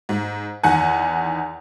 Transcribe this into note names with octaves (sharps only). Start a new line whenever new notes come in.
G#2
E2 D#3 F#5 G#5